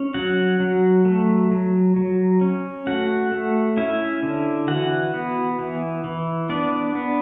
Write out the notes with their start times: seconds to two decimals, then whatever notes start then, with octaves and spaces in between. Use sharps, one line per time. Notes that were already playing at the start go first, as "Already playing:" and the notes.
Already playing: C#4
0.14 F#3 F#4 F#5
0.60 F#3
1.05 A3
1.51 F#3
1.96 F#3
2.41 C#4
2.87 A3 F#4 F#5
3.32 A3
3.77 C#4 E4 E5
4.23 D3
4.68 E3 F#4 F#5
5.14 B3
5.59 E3
6.04 E3
6.49 B3 D4 D5
6.95 B3